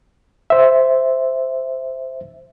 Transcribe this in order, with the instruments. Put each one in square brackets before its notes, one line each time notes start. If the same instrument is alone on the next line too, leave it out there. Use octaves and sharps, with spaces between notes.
[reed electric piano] C5 E5